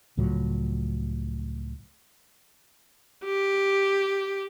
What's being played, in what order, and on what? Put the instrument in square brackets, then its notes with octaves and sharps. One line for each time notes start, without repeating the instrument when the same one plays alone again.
[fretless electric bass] C#2 A2 F3 F#3
[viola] G4